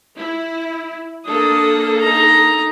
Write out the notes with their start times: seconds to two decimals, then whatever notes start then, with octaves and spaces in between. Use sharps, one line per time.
0.18 E4
1.27 A#3 D4 A4 D#6
2.00 D#4 A#5